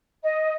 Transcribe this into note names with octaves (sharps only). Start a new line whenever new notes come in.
D#5